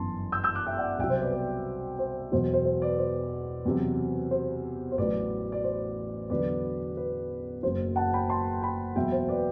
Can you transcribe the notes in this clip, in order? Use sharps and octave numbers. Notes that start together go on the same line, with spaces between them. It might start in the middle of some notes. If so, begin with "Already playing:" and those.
Already playing: G1 F#2 E3 A5 C6
E6 G6
E6 G6
D6 F#6
E5 G5
D5 F#5
C2 B2 F#3 E5 G5
C5
B4 D5
B4 D5
C5
E1 E2 B2 F#3 C5
C5
C5
B4 D5
C5
E2 C3 F#3
C5
C5
A1 A2 F#3 B4 D5
D5
C5
E2 D3 F#3 B4 D5
B4
F#1 F#2 F#3 C5
F#5 A5
G5 B5
A5 C6
G5 B5
E2 B2 F#3 E5 G5
C5
B4 D5